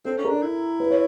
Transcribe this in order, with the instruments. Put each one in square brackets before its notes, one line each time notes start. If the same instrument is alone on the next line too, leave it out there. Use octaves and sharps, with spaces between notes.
[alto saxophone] C4 [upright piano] A4
[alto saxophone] C#4
[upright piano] A#4
[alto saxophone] D4
E4
[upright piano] B4
C#5